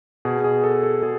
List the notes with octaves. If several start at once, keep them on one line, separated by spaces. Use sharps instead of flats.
B2 G#4
G#4
A4
A4
B2 G#4